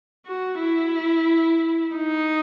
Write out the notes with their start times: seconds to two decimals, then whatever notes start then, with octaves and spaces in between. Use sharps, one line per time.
0.26 F#4
0.60 E4
1.96 D#4